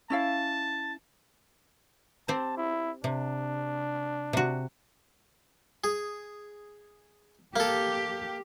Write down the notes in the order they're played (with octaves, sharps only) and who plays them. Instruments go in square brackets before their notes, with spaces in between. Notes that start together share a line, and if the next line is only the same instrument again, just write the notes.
[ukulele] C#4 E4 F5 [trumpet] A5
[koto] C4 G4 C5 [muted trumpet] A5
[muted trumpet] E4
[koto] C3 [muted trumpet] D4
[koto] C3 F#4
[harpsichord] G#4
[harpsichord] A#3 A4 [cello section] G4